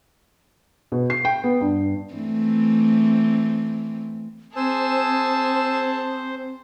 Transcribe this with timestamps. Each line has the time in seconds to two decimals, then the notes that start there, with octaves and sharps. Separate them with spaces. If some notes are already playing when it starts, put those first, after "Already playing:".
0.92 B2
1.10 C7
1.25 G5
1.44 B3
1.61 G2
2.14 E3 A3 C4
4.56 C4 G#4 C5 G#5 A5 E6